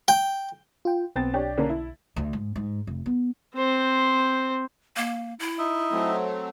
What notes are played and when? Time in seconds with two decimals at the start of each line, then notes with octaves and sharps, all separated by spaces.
0.08 G5
0.85 F4 G5
1.16 B1 B3 C4 A6
1.33 D4 G4 C#5
1.57 D3 A#3 C#4
1.69 E4
2.16 D2
2.33 G#2
2.56 G#2
2.87 F1
3.06 B3
3.55 C4 C5
4.97 A#3
5.39 E4
5.59 D#4 D#5 E5
5.92 F#3 A3 C4